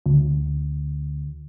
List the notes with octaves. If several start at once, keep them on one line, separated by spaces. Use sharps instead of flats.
D2